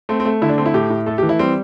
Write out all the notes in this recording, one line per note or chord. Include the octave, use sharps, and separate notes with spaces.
A3 C4
C4
A3
D3 E4
D4
A3 C4
E4
A2 G4
A2
A3 A4
G4
E3
E4
G3 C4